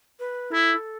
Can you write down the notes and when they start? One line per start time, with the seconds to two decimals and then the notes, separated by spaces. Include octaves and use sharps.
0.19 B4
0.52 E4 A4